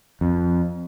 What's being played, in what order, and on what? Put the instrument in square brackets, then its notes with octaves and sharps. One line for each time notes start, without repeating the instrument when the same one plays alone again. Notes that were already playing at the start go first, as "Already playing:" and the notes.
[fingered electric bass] F2